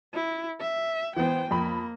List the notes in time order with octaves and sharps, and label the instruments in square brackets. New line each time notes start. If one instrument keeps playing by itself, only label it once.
[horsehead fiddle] E4
E5
[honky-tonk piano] E3 B3 [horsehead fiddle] C5 G5
[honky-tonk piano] F2 B5 [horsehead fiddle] A#3